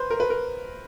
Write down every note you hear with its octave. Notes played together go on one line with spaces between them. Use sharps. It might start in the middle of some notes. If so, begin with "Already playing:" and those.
Already playing: B4 C5
A#4
B4
A#4